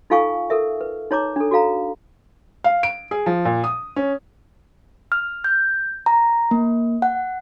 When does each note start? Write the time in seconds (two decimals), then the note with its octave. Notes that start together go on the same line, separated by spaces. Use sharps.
0.10 D#4 F4 A4 F5 G#5 C#6
0.50 A4 A#4 E5
0.81 B4
1.11 D#4 C#5 A#5 D6
1.36 D4 A4
1.51 F#4 A4 F5 A#5
2.64 F5
2.83 D7
3.11 G#4
3.26 F3
3.45 A#2
3.64 D#6
3.96 C#4
5.12 F6
5.44 G6
6.06 A#5
6.51 A#3
7.02 F#5